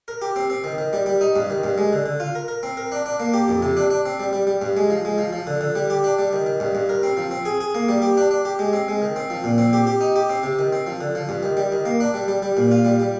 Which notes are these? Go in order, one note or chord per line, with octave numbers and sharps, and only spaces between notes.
A#4
G4
C4
C4
D#3
D#3
G3
G3
D#4
G2
D#3
G2
G#3
D3
D3
F4
A#4
A#4
C4
A#4
D4
D4
A#3
G4
F2
C3
D4
D4
C4
G3
G3
G3
G2
G#3
F3
G#3
F3
F3
D3
D3
G3
G4
D4
G3
D#3
D#3
G2
G2
A#4
C4
F3
C4
G#4
G#4
A#3
G3
G4
D4
D4
G4
G#3
C4
G#3
D#3
C4
F3
A#2
C4
G4
G4
D#4
G4
C4
C3
D#3
C4
F3
D3
F3
G2
D#3
G3
D#3
A#3
D4
G3
G3
G3
A#2
F4
G3
G3